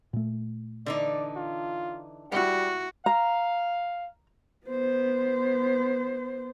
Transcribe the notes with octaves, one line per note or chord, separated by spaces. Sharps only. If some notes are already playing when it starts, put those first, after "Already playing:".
A#2 A3
D3 E3 D#4 D5
F4
G3 E4 F#4 F#5
F5 A#5
B3 C5